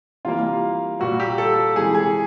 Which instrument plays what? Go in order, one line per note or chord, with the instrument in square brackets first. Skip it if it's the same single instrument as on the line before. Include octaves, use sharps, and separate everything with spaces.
[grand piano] C3 E3 G3 A#3 F4
A#2 G3 A#3 F#4
G4
A4
C3 E3 G#3 G#4
G#4